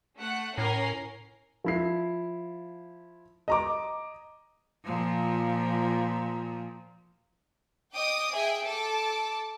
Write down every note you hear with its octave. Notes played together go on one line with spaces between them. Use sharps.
A3 F#5
A2 C#4 A#4 C7
F3 E4 C7
D#5 A#5 D6
A#2 F3
D#5 G5 D6 D#6
G#4 E5 G5 G#5
A4 A5 D6